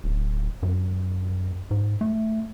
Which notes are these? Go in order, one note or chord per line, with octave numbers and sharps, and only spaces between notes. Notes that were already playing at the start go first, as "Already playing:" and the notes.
D1
F#2
G#2
A3